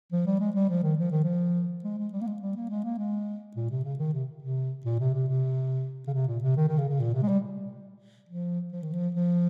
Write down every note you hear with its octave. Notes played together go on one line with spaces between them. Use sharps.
F3
G3
G#3
G3
F3
D#3
F3
D#3
F3
G#3
G#3
G3
A#3
G#3
G3
A#3
G#3
A#3
G#3
A#2
C3
C#3
D#3
C3
C3
A#2
C3
C3
C3
C#3
C3
A#2
C3
D#3
D#3
C#3
C#3
A#2
C3
G#3
G3
F3
F3
D#3
F3
F3